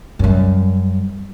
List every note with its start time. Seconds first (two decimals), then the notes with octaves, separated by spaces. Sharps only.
0.19 F#2 G3